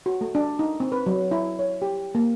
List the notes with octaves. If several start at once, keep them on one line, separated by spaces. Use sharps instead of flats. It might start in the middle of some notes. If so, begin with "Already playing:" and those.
F#4
A3
D4
D#4
C4
B4
F#3
E4
C#5
G4
A#3